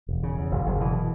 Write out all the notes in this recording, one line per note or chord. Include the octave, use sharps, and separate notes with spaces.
E1
C#3
E2
F#1
F#1
B2 E3